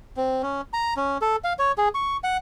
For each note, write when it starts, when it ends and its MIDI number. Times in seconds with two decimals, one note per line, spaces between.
0.17 0.42 60
0.43 0.61 61
0.73 0.94 82
0.97 1.18 61
1.22 1.36 69
1.44 1.53 77
1.59 1.72 73
1.78 1.88 68
1.95 2.17 85
2.24 2.37 78